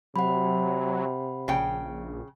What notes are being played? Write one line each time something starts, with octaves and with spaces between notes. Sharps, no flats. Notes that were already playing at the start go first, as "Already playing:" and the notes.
C3 F#3 F#5 B5
A#1 C#3 G5